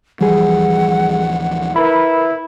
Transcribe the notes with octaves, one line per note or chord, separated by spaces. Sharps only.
D1 E3 F3 G3 G#4 F#5
E4 A#4 B4 B5